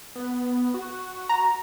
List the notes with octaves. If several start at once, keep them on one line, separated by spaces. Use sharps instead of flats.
B3
F#4
A#5